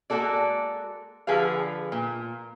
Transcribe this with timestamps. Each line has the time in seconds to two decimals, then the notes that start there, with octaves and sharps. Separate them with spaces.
0.10 G#3 A#3 F#4 A4 D5
1.27 D3 F3 G#4 B4 F5
1.92 A#2